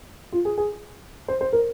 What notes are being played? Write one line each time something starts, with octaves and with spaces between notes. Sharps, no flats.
F4
G#4
G#4
C5
C5
A#4